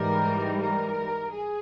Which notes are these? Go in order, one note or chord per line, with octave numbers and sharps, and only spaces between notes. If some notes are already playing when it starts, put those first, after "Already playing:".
Already playing: G#2 E3 G3 A#4
A#4
G#4